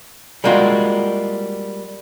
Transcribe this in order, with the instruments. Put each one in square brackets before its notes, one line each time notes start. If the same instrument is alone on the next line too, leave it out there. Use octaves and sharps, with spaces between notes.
[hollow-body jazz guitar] G3 G#3 A#3 F4 F#4